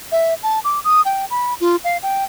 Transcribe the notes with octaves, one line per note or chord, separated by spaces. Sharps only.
E5
A5
D6
D#6
G5
B5
F4
F5
G5